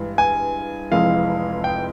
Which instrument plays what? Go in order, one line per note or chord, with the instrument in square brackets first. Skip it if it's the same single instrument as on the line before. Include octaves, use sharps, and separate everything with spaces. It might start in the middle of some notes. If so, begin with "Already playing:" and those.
Already playing: [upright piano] G2 E3 G#3
[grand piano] G#5
[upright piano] F1 F2 E3 G#3 [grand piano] F5
[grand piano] G5